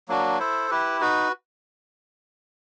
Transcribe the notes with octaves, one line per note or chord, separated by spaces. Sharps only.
F#3 A#3 D4 F#4
E4 A4 C5
E4 G4 B4
D#4 F#4 B4